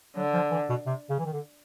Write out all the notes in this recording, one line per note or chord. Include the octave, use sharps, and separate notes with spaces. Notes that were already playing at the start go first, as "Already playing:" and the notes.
D3 F#3
F3
E3
B2
C3
C#3
E3
D#3
D3